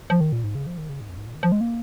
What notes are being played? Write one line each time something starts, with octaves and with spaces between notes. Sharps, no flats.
F3
D#3
A#2
G#2
C#3
F3
D#3
C#3
G#2
F2
G#2
A#2
D#3
F3
G#3
A#3